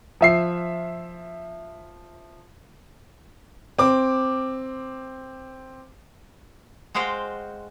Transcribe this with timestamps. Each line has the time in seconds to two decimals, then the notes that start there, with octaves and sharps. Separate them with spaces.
0.21 F3 E5 C7
3.79 C4 D6
6.94 G#3 F#4 C5 F5 G5